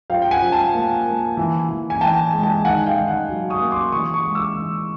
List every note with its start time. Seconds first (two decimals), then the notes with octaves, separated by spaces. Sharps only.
0.10 F3 F5 G5
0.22 G5
0.31 F#5 G#5
0.42 F3
0.52 G5 A5
0.74 A#3
1.06 A#3
1.37 E3
1.69 E3
1.90 G#5
2.01 E3 G5 A5
2.33 G#3
2.43 G5 A5
2.64 D#3 F#5 G#5
2.86 F5 G5
2.97 D#3
3.07 F#5 G#5
3.29 F#3
3.50 C#6 D#6
3.60 A#3
3.71 C6 D6
3.92 E3 C#6 D#6
4.14 C#6 D#6
4.24 G#3
4.35 D6 E6
4.56 E3